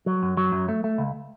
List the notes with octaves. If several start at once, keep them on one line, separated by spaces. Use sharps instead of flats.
F#3
F#2
F#3
F#2
A3
A3
C#2